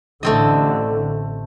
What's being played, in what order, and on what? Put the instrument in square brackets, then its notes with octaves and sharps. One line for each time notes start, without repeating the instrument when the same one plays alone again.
[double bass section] A1 D3 [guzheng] A3 C4 D#5